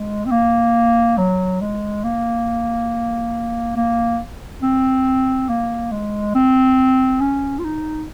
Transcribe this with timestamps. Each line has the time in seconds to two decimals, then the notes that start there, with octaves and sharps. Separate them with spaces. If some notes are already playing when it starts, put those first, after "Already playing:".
Already playing: G#3
0.26 C4
0.31 A#3
1.18 F#3
1.61 G#3
2.04 A#3
3.76 A#3
4.63 C4
5.49 A#3
5.92 G#3
6.35 C4
7.21 C#4
7.59 F4
7.65 D#4